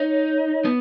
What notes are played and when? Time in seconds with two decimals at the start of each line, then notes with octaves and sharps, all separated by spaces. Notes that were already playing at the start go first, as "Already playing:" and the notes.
Already playing: D#4 C#5
0.65 B3